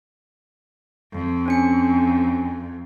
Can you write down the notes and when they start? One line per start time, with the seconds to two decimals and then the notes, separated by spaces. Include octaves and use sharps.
1.13 F2
1.46 C4 C#4 C#7